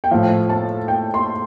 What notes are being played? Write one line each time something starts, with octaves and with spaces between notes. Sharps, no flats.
G5
A2 F3 F5
A5
G5
C6